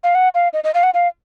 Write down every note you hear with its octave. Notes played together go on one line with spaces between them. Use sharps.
F5
F#5
F5
D#5
D#5
F5
F#5
F5